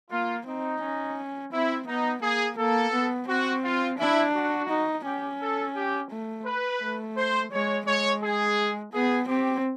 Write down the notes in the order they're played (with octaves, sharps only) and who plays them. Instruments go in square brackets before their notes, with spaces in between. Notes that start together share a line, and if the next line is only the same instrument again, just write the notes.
[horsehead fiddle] A#3 [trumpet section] F4
[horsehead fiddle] C4 [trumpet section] D#4
[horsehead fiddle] C#4
[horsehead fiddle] C4 [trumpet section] E4
[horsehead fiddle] B3 [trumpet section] D#4
[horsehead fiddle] A#3 [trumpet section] G#4
[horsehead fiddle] A#3 [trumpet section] A4
[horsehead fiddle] B3
[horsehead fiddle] C4 [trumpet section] F#4
[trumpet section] F4
[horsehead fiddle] D4 [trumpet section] E4
[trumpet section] F#4
[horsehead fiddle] D#4
[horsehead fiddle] C#4 [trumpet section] G4
[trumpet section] A4
G4
[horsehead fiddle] A3
[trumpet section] B4
[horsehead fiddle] A3
[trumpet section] C5
[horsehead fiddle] G#3 [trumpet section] C#5
[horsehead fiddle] G#3 [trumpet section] C#5
[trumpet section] G#4
[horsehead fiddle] B3 [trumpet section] G#4
[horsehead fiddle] C4 [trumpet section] G4